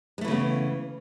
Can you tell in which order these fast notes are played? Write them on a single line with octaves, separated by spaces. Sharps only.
G#3 A3 E3 C#3 B3